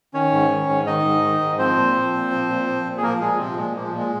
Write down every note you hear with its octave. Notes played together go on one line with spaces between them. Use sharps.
D#3 C#4 C#5
G#2
D#3
G#2
D#3 D#4 D#5
G#2
D#3
G#2
F3 C4 C5
A#2
F3
A#2
F3
A#2
F3
A#2
G#4
F3 A#3 A#4
A#2 G#3 G#4
C3 F3 C4
A#2 G#3
F3 A#3
G#3
A#2
G#3